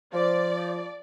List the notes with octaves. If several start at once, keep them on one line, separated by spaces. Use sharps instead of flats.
F3 D5